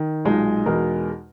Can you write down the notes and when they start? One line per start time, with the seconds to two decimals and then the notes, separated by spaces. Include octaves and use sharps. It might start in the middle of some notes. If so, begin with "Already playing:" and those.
Already playing: D#3
0.25 B1 A#2 G#3 D#4
0.66 E2 B2 G#3 D#4 A#4